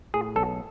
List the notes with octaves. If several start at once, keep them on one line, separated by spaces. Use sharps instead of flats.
A2 G#4
B1 A4